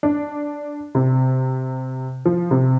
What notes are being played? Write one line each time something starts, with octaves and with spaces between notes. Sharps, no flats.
D4
C3
F3
C3